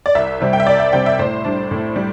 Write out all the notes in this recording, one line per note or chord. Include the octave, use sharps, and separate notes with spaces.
D5
C2 E5
C3 G3 C4
G5
E5
C2 D5
E5
C3 G3 C4 G5
E5
A2 C5
G3 D4
A2
G3